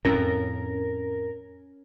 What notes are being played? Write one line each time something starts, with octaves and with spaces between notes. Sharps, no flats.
F2 A2 C#4 A#4